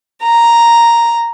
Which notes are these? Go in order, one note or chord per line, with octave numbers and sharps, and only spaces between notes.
A#5